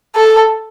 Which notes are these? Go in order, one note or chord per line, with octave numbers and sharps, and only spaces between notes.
A4